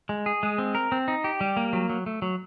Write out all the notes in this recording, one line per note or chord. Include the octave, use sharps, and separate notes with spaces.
G#3
G#4
G#3
C4
A#4
C4
D#4
G4
G3
A#3
F#3
F#3
A3
F#3